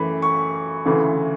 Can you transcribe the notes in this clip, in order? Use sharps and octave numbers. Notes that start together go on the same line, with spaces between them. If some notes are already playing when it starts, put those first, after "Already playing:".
Already playing: F#2 E3 A3 B5
C#6
D2 C#3 E3 A3